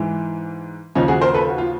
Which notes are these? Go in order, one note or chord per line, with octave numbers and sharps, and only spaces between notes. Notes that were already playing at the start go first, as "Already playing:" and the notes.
Already playing: G#2 E3
D#2 C#3 F3 C#4 D#4
F#4 G#4
A#4 C5
A4 B4
F#4
F4